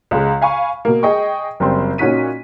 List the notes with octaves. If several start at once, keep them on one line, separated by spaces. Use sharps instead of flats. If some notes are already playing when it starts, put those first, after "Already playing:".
C#2 G#3
F5 G#5 B5 C#6
B2 A#3
G#4 D#5 G5 C#6
F#1 G3 C4 C6
A#2 C#4 D#4 F#4 B6 D#7